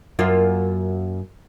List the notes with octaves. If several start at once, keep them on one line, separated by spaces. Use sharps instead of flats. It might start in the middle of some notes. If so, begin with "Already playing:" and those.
F#2 A#3 F4